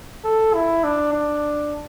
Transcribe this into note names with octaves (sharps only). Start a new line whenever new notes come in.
A4
E4
D4
D4